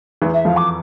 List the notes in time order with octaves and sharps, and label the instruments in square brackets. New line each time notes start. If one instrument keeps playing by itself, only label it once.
[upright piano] E2 E3
[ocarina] E5
[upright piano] F2 F3 [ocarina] F5
[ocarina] D6